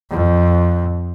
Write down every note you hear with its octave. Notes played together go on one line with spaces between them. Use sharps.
F2